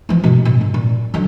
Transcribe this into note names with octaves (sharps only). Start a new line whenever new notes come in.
E3 F3
G2 B2
A#2
G#2
A#2
D3 F#3